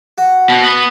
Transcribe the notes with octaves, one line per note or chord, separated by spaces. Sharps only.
F#4
B2
B3